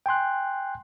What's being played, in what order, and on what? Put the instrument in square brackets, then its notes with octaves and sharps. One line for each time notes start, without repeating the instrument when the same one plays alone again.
[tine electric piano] G5 G#5 C6 F#6